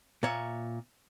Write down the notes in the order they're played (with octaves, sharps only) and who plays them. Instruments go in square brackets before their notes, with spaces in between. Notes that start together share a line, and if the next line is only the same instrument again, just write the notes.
[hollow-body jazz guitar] A#2 C#5 E5